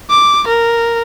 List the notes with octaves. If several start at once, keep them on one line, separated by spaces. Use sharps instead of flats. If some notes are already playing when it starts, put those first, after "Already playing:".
D6
A#4